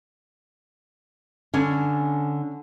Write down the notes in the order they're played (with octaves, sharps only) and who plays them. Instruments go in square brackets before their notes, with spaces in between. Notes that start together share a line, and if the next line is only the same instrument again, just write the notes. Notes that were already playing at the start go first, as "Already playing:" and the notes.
[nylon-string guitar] D3 [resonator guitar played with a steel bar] C#4 D4 G#5